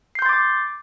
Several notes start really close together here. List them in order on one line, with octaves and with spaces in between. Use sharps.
C7 G6 C6 A6 D6